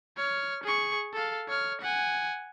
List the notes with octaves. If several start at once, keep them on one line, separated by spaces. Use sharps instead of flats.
C#5 F6
G#4 C#6
A4 F5
C#5 F6
F#5 G#5